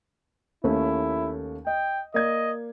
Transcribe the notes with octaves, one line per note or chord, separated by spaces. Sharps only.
D#2 A3 C#4 E4
D#5 G5
A#3 D5 D#5 G#6